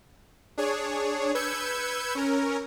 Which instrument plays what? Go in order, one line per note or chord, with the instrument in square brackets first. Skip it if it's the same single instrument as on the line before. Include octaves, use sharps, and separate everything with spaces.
[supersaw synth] D4 G#4 C#5
B4 E6 G6 G#6 C#7
C#4 A#4